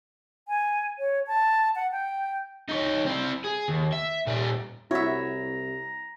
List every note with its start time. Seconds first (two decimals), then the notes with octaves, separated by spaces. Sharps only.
0.48 G#5
0.99 C#5
1.27 A5
1.75 F#5
1.92 G5
2.69 D#4 C#5
3.05 C4 E4
3.44 G#4
3.68 D#2
3.92 E5
4.27 A#2 G3
4.91 C2 E4 F#4 C#5 E5 A#5